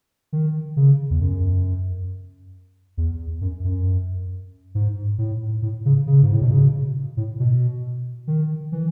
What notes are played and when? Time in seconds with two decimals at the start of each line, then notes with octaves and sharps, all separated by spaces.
0.33 D#3
0.77 C#3
1.10 E2
1.20 F#2
2.97 E2
3.41 F#2
3.64 F#2
4.75 G#2
5.18 A2
5.62 A2
5.85 C#3
6.07 C#3
6.22 G#2
6.32 A2
6.42 B2
6.51 C#3
7.17 A2
7.40 B2
8.28 D#3
8.72 E3